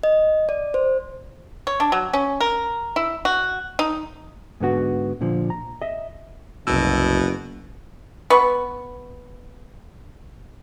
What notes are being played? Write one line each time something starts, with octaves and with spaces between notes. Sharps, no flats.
D#5
D5
C5
C#5
D4
F#3
C#4
A#4
E4
F#4
D#4
G#2 D3 B3 F#4
A#2 D3 F3
A#5
D#5 E5
F#1 C2 B2 E6
B3 B4 C#6